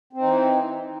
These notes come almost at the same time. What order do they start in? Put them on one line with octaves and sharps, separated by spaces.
C4 D#4 E3